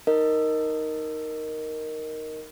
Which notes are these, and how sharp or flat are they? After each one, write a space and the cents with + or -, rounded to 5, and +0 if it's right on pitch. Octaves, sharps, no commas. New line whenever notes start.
D#4 +0 A#4 +0 D#5 +0